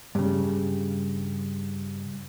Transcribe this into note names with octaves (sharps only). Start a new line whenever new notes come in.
G2 C#3